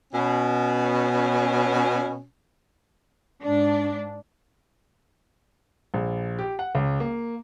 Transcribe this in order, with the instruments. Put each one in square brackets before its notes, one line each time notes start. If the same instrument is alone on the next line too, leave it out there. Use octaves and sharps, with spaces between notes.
[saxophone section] B2 C#4
[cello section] G#2 D4
[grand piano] A#1
G4
F#5
C#2
A#3